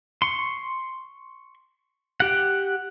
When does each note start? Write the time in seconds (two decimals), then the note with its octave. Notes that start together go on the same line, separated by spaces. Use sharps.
0.22 C6 C#6
2.20 G4 F#5